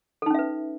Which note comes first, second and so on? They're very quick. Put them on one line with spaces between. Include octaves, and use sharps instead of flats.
A4 D#4 C#4 E5 B4